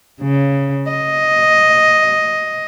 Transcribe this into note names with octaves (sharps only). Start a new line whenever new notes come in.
C#3
D#5